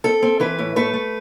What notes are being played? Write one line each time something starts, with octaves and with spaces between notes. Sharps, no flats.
C4 A4
C4
E3 B4
A2
A3 B4
A3